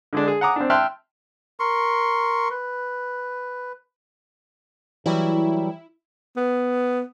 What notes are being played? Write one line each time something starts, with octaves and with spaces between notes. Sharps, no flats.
D3 G#3 D4
G#4
F#5 G#5 A#5 D6 D#6
C4 D4
E5 G5 A5 C6 F6 F#6
A#4 C6 C#6
B4
E3 F#3 G3 E4
B3